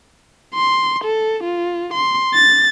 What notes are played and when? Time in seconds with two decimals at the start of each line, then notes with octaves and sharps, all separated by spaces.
0.54 C6
1.04 A4
1.43 F4
1.93 C6
2.34 A6